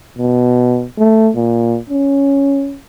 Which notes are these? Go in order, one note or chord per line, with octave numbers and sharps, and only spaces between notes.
B2
A3
A#2
C#4